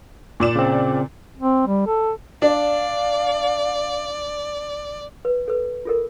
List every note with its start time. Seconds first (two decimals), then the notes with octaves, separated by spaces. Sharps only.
0.40 A#2 D5 E7
0.56 C#3 C4
1.38 C4
1.67 G3
1.87 A4
2.42 D4 D5 F5
5.25 B4
5.48 A4 B4
5.85 F4 A4 A#4